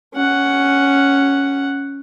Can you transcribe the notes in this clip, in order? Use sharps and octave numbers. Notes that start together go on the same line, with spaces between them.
C#4 F#5